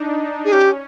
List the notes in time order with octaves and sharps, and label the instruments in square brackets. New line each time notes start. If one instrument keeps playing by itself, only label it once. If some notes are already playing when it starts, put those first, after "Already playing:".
Already playing: [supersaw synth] D4 D#4
[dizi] G#4
[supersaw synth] C#4 [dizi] G4